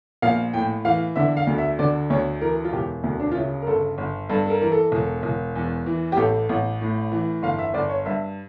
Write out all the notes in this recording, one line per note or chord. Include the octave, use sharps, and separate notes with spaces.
A#1 F5
A2 G5
E3 F5
D3 E5
F5
D2
E5
D3 D5
D2 C#5
E3 A#4
F4
E1 G4
D2
D4
F4
C#3 E4
A#4
G1 A4
G1
G2 A4
A4
A#4
E3 A#4
A4
E1
E1
E2
E3
G4
A1 A4
A1
A2
E3
G1 F5
E5
G1 D5
C#5
G2 E5